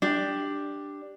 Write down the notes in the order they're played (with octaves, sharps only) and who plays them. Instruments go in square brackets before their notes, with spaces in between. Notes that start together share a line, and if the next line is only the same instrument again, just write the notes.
[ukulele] D4 G4